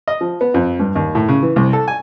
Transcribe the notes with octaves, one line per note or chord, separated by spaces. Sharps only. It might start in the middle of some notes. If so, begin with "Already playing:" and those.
D#5
F3
B3
F2
G2
D#2
A2
C#3
E3
C2
A4
G#5